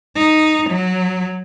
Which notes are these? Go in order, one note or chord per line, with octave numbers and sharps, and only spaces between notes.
D#4
F#3